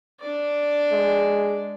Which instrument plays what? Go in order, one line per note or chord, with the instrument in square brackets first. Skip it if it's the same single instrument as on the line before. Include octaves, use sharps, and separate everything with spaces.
[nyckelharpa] D4 D5
[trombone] G#3